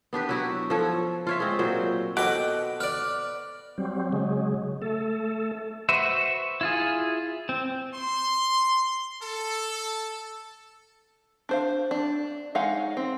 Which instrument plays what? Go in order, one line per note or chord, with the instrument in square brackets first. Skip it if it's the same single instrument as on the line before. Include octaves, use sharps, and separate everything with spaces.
[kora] B3 D4 G4 B4
F#3 E4 F#4
F3 A4 C#5
F4 C#5 E5
G#3 C4
A#2 F#3 C5
[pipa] B2 [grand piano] F#4 A4 C5 [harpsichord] D#5 G5 D6 [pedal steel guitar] F#5
[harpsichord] B4 D5 [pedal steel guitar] F6
[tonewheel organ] F#3 G3 C4
C#3 F#3 G#3
A3 A4
[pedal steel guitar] F#4 B4 C5 E5
E4 F4 G#4
C4
[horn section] C6
A4
[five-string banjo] D4 C5 F5
D4
G#3 D#4 C#5 F5 F#5
C4